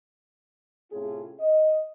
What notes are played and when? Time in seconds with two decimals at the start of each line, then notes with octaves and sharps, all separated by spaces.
0.91 A2 C3 C#4 F4 G#4
1.40 D#5